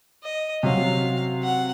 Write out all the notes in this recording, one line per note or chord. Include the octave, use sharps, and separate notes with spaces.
D#5
C3 F#3 C#4 F#4 F5
F#5